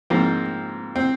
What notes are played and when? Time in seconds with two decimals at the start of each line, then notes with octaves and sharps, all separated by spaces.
0.10 G#2 F3 A#3 C4
0.96 C4